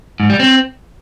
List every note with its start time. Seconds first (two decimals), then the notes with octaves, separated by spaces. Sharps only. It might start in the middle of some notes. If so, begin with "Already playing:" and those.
0.20 G#2
0.30 G3
0.40 C4